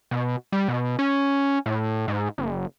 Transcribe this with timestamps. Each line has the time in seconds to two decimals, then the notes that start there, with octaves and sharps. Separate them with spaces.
0.11 B2
0.52 G3
0.68 B2
0.99 C#4
1.66 A2
2.08 G#2
2.38 F#1